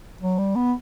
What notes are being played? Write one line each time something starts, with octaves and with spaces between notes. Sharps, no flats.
F#3
G3
B3